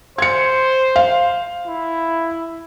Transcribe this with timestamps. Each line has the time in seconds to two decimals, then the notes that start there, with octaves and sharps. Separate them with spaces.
0.18 C5 G#6 C#7
0.96 F5
1.66 E4